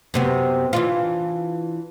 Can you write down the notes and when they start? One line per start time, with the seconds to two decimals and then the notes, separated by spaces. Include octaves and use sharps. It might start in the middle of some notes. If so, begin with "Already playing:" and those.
0.14 F#2 C3 B3
0.73 E3 D4 F4